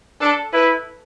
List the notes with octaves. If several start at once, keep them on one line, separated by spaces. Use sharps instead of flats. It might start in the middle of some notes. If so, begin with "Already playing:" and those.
D4 A4
E4 B4